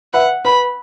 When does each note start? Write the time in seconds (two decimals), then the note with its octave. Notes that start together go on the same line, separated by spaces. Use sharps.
0.14 B4 E5 F#5
0.45 B4 B5